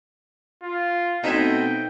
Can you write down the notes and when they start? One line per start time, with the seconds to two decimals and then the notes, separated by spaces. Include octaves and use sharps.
0.63 F4
1.24 B2 A3 C4 D#4 E5 G5 G#5